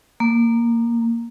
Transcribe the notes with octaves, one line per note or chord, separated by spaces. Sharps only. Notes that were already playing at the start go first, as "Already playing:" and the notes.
A#3